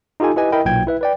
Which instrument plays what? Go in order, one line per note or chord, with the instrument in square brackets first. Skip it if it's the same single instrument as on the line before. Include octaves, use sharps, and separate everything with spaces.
[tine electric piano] D#4 F4 G4 A4 G#5
E4 G4 B4 D#5 G#5
E4 A#4 D#5 G5 B5
B1 A#2 G5 G#6
E4 B4 E5
B4 D5 G5